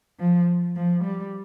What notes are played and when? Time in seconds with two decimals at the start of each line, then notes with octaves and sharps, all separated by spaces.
0.20 F3
0.76 F3
1.05 G3